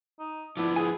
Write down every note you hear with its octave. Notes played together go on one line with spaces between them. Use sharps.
D#4
F3 B3 D4 E4
G#4 G#5